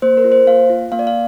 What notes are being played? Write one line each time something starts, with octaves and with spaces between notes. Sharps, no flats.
A#3 C5
A#4
F4
C5
A#3 F5
F4
A#3 F5
D5
F5